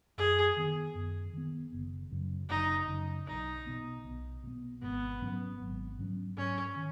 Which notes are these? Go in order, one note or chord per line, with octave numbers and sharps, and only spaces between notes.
F#2 G#4
D#3 B3
F#2
D#3 B3
F#1
F#2 C#3
F#1 D#4
F#2 C#3
B1 D#4
B2 B3
B1
B2 B3
G#1 B3
G#2 F#3 C#4
G#1
G#2 F#3 C#4
G#2 C#4
D#3